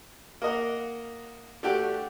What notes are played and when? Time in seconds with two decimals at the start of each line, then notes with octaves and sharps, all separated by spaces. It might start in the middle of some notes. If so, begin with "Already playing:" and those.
0.42 A#3 A#4 D#5 F#5
1.63 A3 D4 F#4 G4 D5 G5